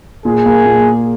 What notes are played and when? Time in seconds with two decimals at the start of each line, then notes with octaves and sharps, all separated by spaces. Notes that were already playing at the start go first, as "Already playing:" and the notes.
0.25 A#2 G#4
0.46 A#3
0.66 A#2